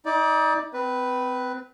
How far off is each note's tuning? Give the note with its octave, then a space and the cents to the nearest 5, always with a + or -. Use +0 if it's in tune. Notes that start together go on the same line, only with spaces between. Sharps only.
D#4 +35 D5 +5
C4 -30 B4 +0